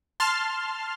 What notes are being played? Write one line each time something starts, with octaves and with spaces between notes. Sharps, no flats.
A5 C6 F6